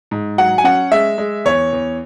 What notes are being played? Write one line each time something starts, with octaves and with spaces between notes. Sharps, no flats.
G#2
F#3 F#5
G#5
C#4 F#5
G#3 E5
G#3
E2 C#5
E2